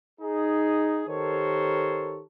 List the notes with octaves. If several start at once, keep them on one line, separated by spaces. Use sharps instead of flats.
D#4 G#4
D#3 G4 A4 A#4 C5 C#5